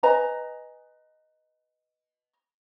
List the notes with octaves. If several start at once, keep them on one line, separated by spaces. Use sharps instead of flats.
B4 D#5 G#5 A#5